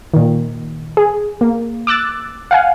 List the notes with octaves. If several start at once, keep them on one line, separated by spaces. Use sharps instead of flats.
A#2 D#3
G#4
A#3
D6 E6 F#6 A6
F5 F#5 G#5